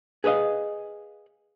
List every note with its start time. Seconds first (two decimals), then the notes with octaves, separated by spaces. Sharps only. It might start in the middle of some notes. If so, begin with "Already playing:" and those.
0.24 G#4 B4 C#5 D#5 F5